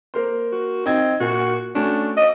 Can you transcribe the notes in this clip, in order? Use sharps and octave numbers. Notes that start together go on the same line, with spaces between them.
A#3 A#4 C5
F#4
C4 D#4 G#6
A#2 A#3 F#4
A3 C#4 D4 F#4
D#5